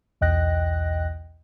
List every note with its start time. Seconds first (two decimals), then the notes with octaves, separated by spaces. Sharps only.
0.21 B1 E2 D#5 G5 F#6 A#6